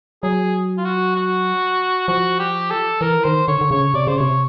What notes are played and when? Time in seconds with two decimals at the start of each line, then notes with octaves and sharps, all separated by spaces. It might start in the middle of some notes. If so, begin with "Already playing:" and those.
0.23 F#3 G#4
0.78 F4
0.85 F#4
1.16 F#4
2.08 F3 F#4
2.39 G4
2.70 A4
3.01 E3 A#4
3.24 D#3 C5
3.48 D3 C#5
3.61 D3
3.71 C#3 C#5
3.94 C3 D5
4.07 C#3 C5
4.18 C3 C#5